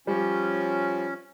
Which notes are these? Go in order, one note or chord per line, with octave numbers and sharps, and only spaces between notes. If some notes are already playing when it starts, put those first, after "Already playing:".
F3 G3 C#4